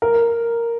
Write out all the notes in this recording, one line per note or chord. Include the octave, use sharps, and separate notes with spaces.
A#4